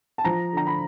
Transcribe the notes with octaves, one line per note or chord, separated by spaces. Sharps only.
A5
F3 A#5
D3 A#5
B5